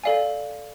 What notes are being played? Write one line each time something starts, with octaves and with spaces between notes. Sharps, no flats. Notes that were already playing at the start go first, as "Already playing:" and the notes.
A4 D5 F5 G#5